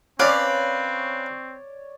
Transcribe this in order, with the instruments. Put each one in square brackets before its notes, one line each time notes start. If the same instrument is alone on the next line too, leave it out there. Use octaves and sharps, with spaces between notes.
[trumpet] C4 [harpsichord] C#4 [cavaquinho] B4 F5 D6 [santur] C#5 D5